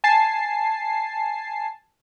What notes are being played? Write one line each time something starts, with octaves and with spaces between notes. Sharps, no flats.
G#5 A5 C7